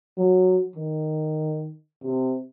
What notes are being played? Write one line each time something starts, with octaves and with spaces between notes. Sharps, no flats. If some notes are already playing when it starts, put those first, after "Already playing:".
F#3
D#3
C3